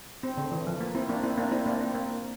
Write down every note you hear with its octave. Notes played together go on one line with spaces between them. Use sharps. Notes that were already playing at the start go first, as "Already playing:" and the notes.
C4
D3
E3
F3
A#3
C4 E4
A#3 D4
C4 E4
A#3 D4
C4 E4
A#3 D4
C4
A#3